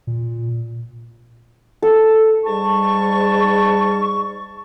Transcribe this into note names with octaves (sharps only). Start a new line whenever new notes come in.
A#2
A4
G#2 G3 A5 C#6